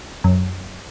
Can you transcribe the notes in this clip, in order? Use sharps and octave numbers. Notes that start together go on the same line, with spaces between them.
F#2